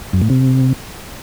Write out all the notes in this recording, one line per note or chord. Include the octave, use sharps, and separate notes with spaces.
F#2
A2
C3